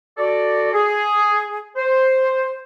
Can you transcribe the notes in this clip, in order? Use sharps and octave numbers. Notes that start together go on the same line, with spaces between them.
F#4 A4 D5
G#4
C5